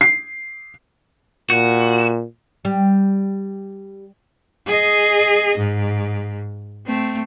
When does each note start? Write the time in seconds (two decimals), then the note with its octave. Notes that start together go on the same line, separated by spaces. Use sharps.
0.01 C7
1.50 A#2 F#4
2.65 G3
4.66 G#4 D#5
5.58 G#2
6.86 A3 C4